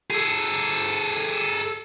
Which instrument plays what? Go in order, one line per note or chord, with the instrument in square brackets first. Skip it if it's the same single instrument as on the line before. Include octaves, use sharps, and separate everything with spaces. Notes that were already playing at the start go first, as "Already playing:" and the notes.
[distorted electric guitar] G#4 A4